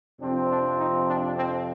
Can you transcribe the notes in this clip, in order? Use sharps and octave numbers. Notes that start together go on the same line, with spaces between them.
F2 C3 F3 C4 D4
D4
D#4
D4
C4